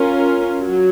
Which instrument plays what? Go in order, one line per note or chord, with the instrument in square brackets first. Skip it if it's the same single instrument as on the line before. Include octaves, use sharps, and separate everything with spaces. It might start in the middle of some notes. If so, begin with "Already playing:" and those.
Already playing: [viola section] C#4 F4 A#4
F#3